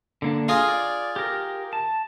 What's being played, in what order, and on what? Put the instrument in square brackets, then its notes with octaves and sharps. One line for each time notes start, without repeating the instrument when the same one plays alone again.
[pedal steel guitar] D3 A#3 D4
[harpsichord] F4 G#4 [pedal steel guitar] D#5 F5
[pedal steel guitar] D5
G4 A#4
A5